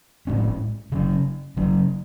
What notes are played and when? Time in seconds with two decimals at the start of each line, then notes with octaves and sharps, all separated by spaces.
0.27 A2 G#3 C#4
0.92 C#3 F#3 C#4
1.57 C#3 F#3 C#4